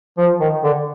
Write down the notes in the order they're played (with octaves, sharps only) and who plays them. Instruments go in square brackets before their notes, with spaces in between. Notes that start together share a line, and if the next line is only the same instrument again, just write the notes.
[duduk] F3
D#3
D3